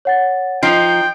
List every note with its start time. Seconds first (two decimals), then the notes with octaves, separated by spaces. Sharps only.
0.05 C#5 F#5 A6
0.63 F3 D#4 G5 C7